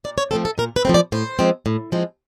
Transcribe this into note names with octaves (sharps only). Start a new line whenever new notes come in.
A#2 D5
C#5
F3 A3 C4 A4
A4
A#2 A#4
B4
F3 A3 C4
D5
A2 C5
F3 G#3 C4
A2
F3 G#3 C4